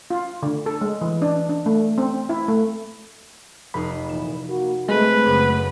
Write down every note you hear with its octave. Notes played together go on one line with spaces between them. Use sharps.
F4
D3
A4
G#3
E3
D4
D4
A3
C4
E4
A3
F1 D#4 B5 C7
F2 A#2 E3 E7
A#3 F#4
G#3 A3 C4 G#4 B4
F#1 F#2